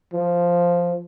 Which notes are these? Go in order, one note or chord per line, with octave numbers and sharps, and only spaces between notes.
F3